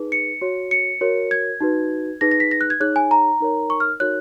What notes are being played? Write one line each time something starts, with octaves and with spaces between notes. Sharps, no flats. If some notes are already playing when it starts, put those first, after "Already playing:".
Already playing: D#4 G#4 B4
C#7
F#4 C#5
C#7
F#4 A#4 C#5
G#6
D#4 F#4 B4
D#4 G#4 B4 A#6
A#6
B6
A#6
F#6
G#6
D#4 G#4 C#5 F#6
G#5
A#5
D#4 A#4 C#5
C#6
F6
D#4 F#4 A#4 C#5 F#6